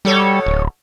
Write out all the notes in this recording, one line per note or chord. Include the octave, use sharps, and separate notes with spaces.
B2 G3 A4 C#5
D1